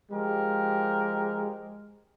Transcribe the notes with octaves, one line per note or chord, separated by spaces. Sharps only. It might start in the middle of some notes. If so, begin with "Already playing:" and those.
F3 G#3 G4 A#4